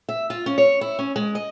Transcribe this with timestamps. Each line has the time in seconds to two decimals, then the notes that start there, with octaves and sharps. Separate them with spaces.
0.09 E5
0.30 F4
0.46 C#4
0.58 C#5
0.81 E4
0.99 C#4
1.16 G#3
1.35 D#5